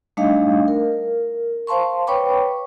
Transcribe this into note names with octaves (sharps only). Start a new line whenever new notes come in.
G3 A3 D4 D#4 D#5 F5
A#4
C5 F5 A5 C6 C#6
B4 C#5 G5 B5 C#6 D6